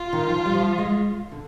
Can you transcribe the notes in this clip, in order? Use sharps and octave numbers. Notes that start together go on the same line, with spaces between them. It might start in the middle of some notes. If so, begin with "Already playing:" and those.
Already playing: F4
D#3
F3
G3
F3
G#3
D3